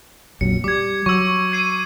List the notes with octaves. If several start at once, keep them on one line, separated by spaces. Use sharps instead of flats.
A#1 F2 F#3 C#7
G3 D6 G#6
F#3 C#6 E6
G#6 C7 D#7